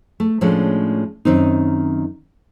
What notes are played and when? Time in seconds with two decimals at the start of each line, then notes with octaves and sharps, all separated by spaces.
0.20 A3
0.41 A2 F3 G#3 A3 C#4 D4
1.25 F#2 D#3 C4 D#4